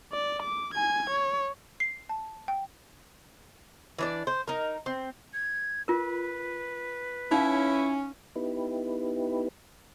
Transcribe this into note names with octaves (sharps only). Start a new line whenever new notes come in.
D5
D6
G#5 G#6
C#5
C7
A5
G5
E3 D4 D5
C5
D#4 A#4
C4
G#6
F4 A#4 B4
C#4 D#4 E4 F5
B3 D#4 E4 G4 B4